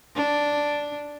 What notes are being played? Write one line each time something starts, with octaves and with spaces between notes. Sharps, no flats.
D4